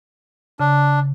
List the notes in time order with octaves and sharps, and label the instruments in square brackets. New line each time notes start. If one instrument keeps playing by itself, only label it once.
[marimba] C#3 [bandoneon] D4